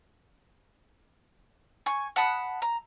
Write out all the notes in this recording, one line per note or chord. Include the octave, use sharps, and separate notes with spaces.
G#5 C#6
F#5 A5 B5 D#6
A#5